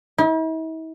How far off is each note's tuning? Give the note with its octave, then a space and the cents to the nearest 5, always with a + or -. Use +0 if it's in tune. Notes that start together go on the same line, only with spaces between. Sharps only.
E4 -45